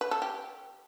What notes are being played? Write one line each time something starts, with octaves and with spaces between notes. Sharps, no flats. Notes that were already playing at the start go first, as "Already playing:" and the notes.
B4
A4
G4